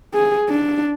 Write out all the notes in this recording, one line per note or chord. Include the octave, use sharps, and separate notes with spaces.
G#4
D4